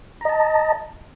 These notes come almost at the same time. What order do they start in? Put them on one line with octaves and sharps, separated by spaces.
A#5 D#5 A5